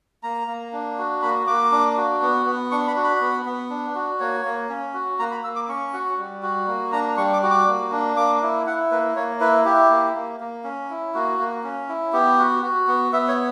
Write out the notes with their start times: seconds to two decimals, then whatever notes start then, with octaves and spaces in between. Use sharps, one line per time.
0.23 A#3 A#5
0.48 A#3
0.73 D4
0.98 F#4
1.22 A#3 B5
1.47 A#3 D6
1.72 D4
1.97 F#4
2.22 B3
2.46 B3
2.71 D4 C#6
2.87 B5
2.96 F#4
3.04 B5
3.21 B3
3.46 B3
3.70 D4
3.95 F#4
4.20 A#3 C#5
4.45 A#3
4.69 C#4
4.94 F#4
5.19 A#3 A#5
5.31 B5
5.44 A#3 E6
5.56 D6
5.68 C#4 C#6
5.93 F#4
6.18 G3
6.43 F#4
6.68 A#3
6.92 D4 A#5
7.17 G3 C#6
7.33 D6
7.43 F#4
7.51 D6
7.67 A#3
7.91 D4
8.17 A#3 D6
8.42 E4
8.66 E4 F#5
8.91 A#3 B4
9.16 A#3 C#5
9.40 E4 B4
9.65 E4 G4
9.90 A#3
10.15 A#3
10.40 A#3
10.64 C#4
10.90 E4
11.15 A#3 F#4
11.40 A#3
11.64 C#4
11.89 E4
12.13 B3 G4
12.38 F#4
12.63 F#4
12.87 B3
13.12 B3 E5
13.28 C#5